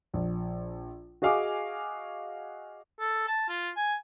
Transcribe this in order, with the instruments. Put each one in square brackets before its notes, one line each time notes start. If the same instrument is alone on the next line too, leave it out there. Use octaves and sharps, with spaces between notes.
[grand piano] A#1
F#4 G#4 D#5 F5 G#5 D6
[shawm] A4
A5
F4
G#5